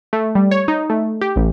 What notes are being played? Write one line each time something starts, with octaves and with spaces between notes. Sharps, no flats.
A3
G3
C#5
D#4
A3
G4
A1